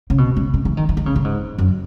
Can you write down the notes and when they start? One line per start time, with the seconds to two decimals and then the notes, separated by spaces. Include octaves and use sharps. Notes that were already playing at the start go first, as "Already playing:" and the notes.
0.10 C#3
0.18 B2
0.36 C#3
0.54 C#3
0.65 E3
0.77 D#3
0.89 E3
0.97 D#3
1.06 C#3
1.16 A2
1.24 G#2
1.58 F#2